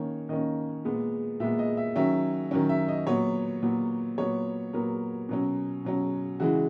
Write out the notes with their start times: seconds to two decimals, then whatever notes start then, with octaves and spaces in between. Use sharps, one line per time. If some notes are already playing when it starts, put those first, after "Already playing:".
Already playing: D#3 A#3 C#4 C#5
0.29 D#3 A#3 C#4 D#5
0.85 A#2 G#3 B3
1.40 A#2 G#3 B3 E5
1.59 D#5
1.77 E5
1.96 D#3 F#3 C#4 E5
2.51 D#3 F#3 C#4
2.69 E5
2.88 D#5
3.07 A#2 F#3 B3 C#5
3.62 A#2 F#3 B3
4.18 A#2 F#3 B3 C#5
4.73 A#2 F#3 B3 A#4
5.29 B2 F#3 C#4
5.85 B2 F#3 C#4
6.40 C#3 E3 G#3 F#4